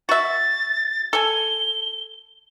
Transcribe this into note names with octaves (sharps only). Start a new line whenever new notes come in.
F#4 E5 A6
A4 G#5 G7